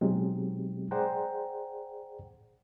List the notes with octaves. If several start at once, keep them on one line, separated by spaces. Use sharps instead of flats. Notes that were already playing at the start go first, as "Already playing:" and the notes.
B2 F#3 G#3 C4 D#4 G4
G#4 C5 D5 F#5 G5 A#5